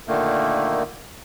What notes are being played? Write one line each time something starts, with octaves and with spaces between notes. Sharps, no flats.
A#2 D3 D#3 A3 A#3